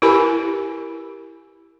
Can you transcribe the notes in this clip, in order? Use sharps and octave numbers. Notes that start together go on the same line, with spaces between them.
E4 G4 A#4 B4 G#5 B5